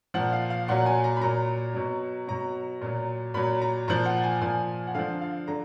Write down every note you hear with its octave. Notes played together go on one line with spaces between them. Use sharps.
A#2 F3 F#5
F5
F5
A#2 F#3 F#5
G#5
A#5
B5
A#2 F#3 A#5
B2 F#3
B2 F#3 A#5
A#2 F#3
A#2 F#3 B5
A#5
A#2 F3 A#5
F#5
G#5
A#2 F3 G#5
F#5
D3 F3 F5
F5
D3 A#5